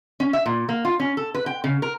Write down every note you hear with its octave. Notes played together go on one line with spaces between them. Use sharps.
C#4
E5
A#2
A#3
F4
C#4
A4
B4
G5
C#3
A#4